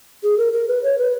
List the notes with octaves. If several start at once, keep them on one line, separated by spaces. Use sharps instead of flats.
G#4
A#4
A#4
B4
C#5
B4